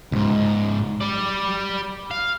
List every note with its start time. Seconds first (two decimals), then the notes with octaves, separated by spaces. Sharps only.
0.12 C#2 G#2
1.01 G3 D5
2.11 F5